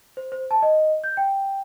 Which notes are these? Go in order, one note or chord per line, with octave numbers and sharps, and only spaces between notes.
C5
C5
A5
D#5
G6
G5